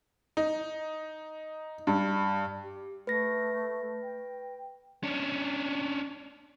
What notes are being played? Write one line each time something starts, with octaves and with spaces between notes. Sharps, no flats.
D#4
G2
G4
A3 B4 A#6
G5
C#4 D4